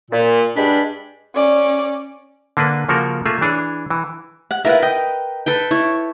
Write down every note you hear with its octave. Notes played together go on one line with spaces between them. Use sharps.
A#2
G2 G3 G#3 D4 B5
C#4 D5
D3 A#3 D4 B4
C#3 F3 A#3 F#4 A4 A#4
A3 A#3 F4 G#4 E5
E3 D4 G#4 C#5
E3
F#5
E4 F4 A#4 B4 F#5
D#5 G5
A4 B4 G5
E4 C#5